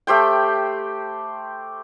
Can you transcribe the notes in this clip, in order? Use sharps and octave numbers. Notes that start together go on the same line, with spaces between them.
A3 G4 C5 G5